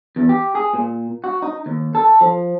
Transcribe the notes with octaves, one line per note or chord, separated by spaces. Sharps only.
E2
G4
G#4
A#2
F#4
D#4
D#2
A4
F3